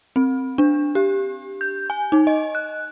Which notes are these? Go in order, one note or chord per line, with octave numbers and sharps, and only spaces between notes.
C4
D4
G4
G6
G#5
D#4
D#5
F#6